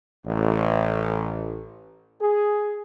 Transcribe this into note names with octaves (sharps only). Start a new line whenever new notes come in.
A1
G#4